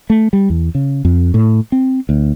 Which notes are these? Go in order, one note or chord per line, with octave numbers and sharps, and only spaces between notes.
A3
G3
E2
C#3
F2
A2
C4
D2